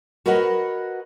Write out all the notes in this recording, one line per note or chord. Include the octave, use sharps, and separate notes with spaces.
F#4 A#4 B4 C#5 D#5 F#5